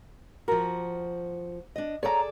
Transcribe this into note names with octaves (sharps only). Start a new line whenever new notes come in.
F3 F#4 A#4
D4 D#5
G#4 A4 C#5 D5 A#5